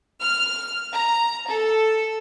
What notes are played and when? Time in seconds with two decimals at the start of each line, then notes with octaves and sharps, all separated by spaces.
0.19 F6
0.94 A#5
1.47 A4